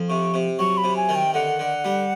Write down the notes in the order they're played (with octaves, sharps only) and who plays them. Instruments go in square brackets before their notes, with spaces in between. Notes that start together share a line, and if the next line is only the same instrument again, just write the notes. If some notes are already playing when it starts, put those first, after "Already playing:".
Already playing: [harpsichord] F2
[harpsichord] C3 [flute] C#6
[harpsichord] C3
[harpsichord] F#3 [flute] C#6
[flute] B5
[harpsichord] C3
[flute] G#5
[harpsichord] D#3
[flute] G5
[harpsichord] D3 [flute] F#5
[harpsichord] D3
G3